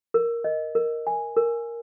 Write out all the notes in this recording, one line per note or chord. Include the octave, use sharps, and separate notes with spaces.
A#4
D#5
A#4
G#5
A#4